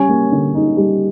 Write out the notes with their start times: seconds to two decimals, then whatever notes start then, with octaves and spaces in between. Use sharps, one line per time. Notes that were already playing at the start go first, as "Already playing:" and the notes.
Already playing: G3 C#4
0.09 A#3
0.32 D3
0.55 D#4
0.77 G3